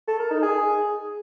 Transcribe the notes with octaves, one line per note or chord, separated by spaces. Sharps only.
A4
A#4
D#4
G#4